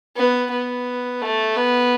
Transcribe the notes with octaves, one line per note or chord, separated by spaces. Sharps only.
B3
B3
A3
B3